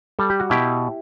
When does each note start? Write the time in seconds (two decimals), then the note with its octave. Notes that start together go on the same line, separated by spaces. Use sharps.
0.19 G3 A4
0.30 G4
0.40 F#4
0.50 B2 E4 G4